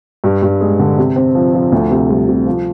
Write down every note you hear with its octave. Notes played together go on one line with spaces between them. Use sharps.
G2
G2
G#3
D3
C3
C4
F3
F3
D2
C3
G3
C3
F3